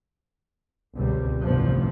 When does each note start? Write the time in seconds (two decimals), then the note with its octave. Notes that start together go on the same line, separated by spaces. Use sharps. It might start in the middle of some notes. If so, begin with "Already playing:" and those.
0.97 G1 C#2 B2 G3 C4
1.43 A1 G2 C3 D#3 F3 B3